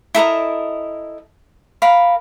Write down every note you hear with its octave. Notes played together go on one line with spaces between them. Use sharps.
E4 A4 A#4 D#5
A#4 F5 B5